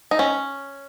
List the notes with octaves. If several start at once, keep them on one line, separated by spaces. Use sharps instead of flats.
D#4
C#4